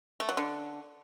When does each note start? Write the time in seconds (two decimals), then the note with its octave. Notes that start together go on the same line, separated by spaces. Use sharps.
0.20 A3
0.29 F#3
0.37 D3